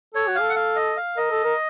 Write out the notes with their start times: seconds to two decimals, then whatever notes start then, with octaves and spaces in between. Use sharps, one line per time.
0.14 A4 C#5
0.27 F#4
0.35 F5
0.40 A4
0.49 F#5
0.56 F5
0.76 D#5
0.97 F5
1.17 A#4 D#5
1.31 A4
1.44 A#4